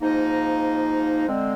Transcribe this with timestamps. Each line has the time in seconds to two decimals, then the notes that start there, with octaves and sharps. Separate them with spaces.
0.01 G#2 F3 A#3 D#4
1.28 D3 G#3 C4